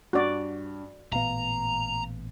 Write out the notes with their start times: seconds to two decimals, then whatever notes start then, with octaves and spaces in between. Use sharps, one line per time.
0.13 G2 F#4 D5
1.13 A1 A#2 B3 F5 A#5